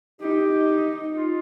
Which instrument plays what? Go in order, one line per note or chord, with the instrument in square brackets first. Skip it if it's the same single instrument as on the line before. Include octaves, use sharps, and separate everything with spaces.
[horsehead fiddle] D#4 [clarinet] G4
[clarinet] F4